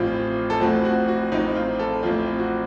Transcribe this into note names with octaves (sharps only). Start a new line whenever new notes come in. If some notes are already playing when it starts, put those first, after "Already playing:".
Already playing: A1 A2 F3 C4 F4
A4
A1 A2 F3 C4 F#4
F#4
F#4
A1 A2 F3 C4 D#4
F4
A4
A1 A2 F3 C4 F4
F#4